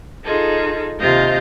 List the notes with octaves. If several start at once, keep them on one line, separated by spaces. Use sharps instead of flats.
D#4 F4 G#4 A4
D#2 C3 F4 D#5 F5 G6